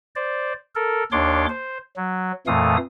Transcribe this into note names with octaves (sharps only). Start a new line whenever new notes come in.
C5 D5
A4 A#4
D#2 D4 C#5 C6 D6
C5
F#3
F2 A#2 E3 A3 F5 D#6